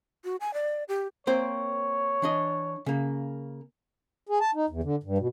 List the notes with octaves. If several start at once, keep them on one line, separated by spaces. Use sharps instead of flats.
F#4
G#5
D5
G4
A#3 C4 C5 C#5
E3 D4 D#5
C#3 A#3
G#4
A5
D#4
E2
D3
G2
B2